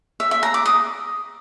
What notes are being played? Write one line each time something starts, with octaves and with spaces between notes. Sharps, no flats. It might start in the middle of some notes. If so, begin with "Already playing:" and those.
E5
E5
A#5
D6
D#6